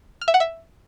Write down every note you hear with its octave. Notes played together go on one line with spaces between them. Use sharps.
F6
E5
F#5
E5